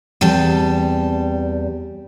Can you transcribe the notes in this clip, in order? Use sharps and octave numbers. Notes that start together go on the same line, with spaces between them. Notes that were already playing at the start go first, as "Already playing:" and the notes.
E2 G3 C4 A5